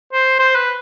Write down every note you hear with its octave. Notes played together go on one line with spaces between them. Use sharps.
C5
C5
B4